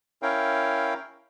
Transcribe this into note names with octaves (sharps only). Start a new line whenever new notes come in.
C#4 E4 A#4 C#5 F5 G5